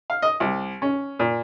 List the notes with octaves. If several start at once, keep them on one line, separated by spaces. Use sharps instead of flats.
F5
D#5
C2
C#4
A#2